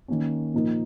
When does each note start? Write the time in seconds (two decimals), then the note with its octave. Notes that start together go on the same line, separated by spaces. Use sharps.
0.08 D#3 A#3 C#4
0.54 A#2 F3 A#3 D#4 A#4